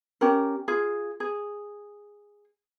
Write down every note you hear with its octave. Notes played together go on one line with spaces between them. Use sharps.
C#4 G4 A#4
F4 G#4
G#4